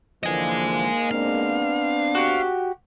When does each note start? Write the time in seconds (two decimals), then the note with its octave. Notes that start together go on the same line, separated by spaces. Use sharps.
0.24 G#2 D3 E3 F3 G#3 A#3 D#5 G#5
1.11 B3 C4 D4 F5
2.15 F#4 G4